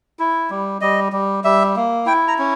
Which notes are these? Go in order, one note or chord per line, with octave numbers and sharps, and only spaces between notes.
E4
G3
G3 D#5
G3
G3 E5
A#3
E4 G5
A#5
C#4